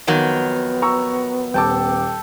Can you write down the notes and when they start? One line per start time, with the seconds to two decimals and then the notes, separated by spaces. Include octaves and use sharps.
0.07 F2 D#3 F#3 B3
0.82 A#5 C#6 E6
1.54 D#1 A4 G5 A5 D6